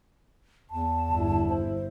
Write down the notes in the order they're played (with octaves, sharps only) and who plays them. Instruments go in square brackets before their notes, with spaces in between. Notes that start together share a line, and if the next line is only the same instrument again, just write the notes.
[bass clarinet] E2 [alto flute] A5
[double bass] G1 E4
[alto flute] C5